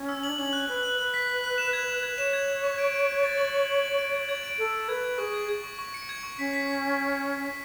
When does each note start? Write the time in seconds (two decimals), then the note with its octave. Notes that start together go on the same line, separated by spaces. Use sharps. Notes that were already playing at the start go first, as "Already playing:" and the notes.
Already playing: C#4
0.09 E6
0.23 F#7
0.29 D4
0.38 C#4 F#7
0.53 F#6
0.69 B4 F#6
0.83 F#6
0.98 B4 F#6
1.14 B6
1.28 B6
1.44 F#6
1.58 E7
1.73 G#6
1.88 E7
2.03 G#6
2.18 C#5 E7
2.33 G#6
2.48 E7
2.64 C#6
2.78 D7
2.93 D7
3.09 D7
3.23 A6
3.38 F#7
3.53 F#7
3.69 F#7
3.84 F#7
3.99 D7
4.14 G#6
4.29 G#6
4.43 D7
4.58 A4 F#7
4.73 D7
4.88 B4 G#6
5.04 G#6
5.18 G#4 C#6
5.34 G#6
5.49 G#6
5.64 C#6
5.79 C#6
5.94 C#7
6.09 G#6
6.23 C#6
6.38 C#4 B6
6.53 B6